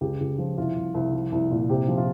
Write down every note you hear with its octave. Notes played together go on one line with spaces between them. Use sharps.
C#2 G4
C#2
F3
C2 F4
C2
C2
F3
C2
A#2
C3 G4
F3
F4